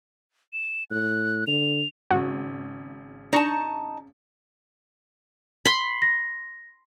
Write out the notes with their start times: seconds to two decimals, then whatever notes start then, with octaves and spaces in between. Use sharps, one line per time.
0.53 E7
0.91 A2 F#6
1.47 D3 F7
2.11 G#1 C#3 F#4
3.33 D4 D#4 A5 A#5 C#6
5.65 B5 C6
6.02 A#6